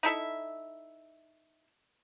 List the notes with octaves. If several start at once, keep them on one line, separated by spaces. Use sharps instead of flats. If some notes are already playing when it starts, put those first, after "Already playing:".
D#4 E4 A4 E5